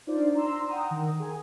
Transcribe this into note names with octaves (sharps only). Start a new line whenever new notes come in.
D4 D#4 F4 C5 D5
A#5 C6 E6
F#5 G5 A#5 D#6
D#3
G#4 G#5